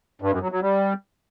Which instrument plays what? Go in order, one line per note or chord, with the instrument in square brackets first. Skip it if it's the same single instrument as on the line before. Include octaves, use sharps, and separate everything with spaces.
[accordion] G2
F#2
F#3
F#3
G3